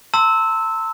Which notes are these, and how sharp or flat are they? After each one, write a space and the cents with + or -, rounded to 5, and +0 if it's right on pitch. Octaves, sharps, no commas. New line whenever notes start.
A5 +45 C6 +0 E6 -10